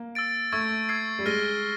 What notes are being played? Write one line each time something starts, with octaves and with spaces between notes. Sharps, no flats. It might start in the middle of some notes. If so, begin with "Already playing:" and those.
Already playing: A#3
E6 A6 D7
A3 C#6 E6 G#6
E6 G#6 C7
G3
G#3 F6 A#6 D#7 G7